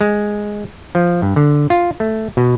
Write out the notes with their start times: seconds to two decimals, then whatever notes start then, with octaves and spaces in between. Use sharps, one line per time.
0.01 G#3
0.95 F3
1.22 G2
1.36 D3
1.70 F4
2.00 A3
2.37 B2